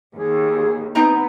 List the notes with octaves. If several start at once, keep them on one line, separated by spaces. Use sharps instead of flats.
D#2 G#4
B3 C4 D#4 A#5